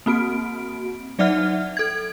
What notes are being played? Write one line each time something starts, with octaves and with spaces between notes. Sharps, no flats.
A#3 C4 F#4 D7
F#3 D#4 D5 E5 F#5 F6
A4 G#6